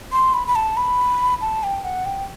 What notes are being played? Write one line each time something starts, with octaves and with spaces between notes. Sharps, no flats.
C6
B5
B5
A5
B5
A5
G5
F#5
G5